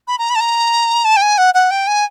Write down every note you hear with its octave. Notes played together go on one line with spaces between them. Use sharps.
B5
A#5
B5
A5
A#5
A5
G5
G#5
F#5
F#5
G5
G#5